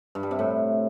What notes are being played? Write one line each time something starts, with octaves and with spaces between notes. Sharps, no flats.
G2
G3
C3
A2